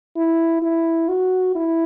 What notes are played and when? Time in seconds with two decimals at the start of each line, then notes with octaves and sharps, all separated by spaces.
0.16 E4
0.62 E4
1.08 F#4
1.55 E4